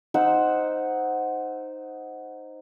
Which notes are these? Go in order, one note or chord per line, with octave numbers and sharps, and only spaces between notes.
D#4 C5 F#5 E6